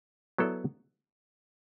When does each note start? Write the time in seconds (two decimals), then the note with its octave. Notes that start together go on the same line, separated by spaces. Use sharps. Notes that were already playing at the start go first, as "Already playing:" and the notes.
0.38 F#3 B3 E4 A4 D5